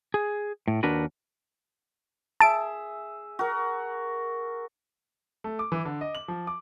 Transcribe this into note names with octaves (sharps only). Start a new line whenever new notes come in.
G#4
A2
D#2 D4 F#4 A#4 B4
G#4 E5 A5 D7
F#4 A#4
A3
D6
E3
D3
D#5
F#7
F3
D6